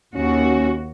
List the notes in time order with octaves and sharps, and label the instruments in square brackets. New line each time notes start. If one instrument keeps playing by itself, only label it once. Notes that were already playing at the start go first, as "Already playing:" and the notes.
[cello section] D#2 F#4 [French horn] C#4